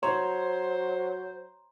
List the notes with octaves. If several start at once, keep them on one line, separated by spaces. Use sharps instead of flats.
F#3 C5 C#5 A#5 C6